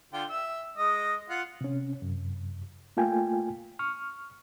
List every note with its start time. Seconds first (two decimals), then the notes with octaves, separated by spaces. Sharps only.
0.13 D3 F4 G5
0.30 E5 E6
0.77 G#3 D#5
1.30 F4 F#5
1.61 C3 C#4
2.02 F#2 C3
2.97 A3 A#3 F4 G5 G#5
3.79 C#6 F6